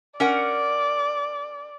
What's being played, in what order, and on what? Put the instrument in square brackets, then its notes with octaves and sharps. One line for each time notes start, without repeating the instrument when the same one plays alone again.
[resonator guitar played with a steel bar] C#4 A#4 F#5 [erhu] D5